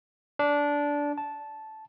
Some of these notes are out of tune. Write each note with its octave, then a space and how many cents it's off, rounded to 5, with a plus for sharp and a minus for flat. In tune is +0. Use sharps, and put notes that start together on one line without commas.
D4 -15
A5 -10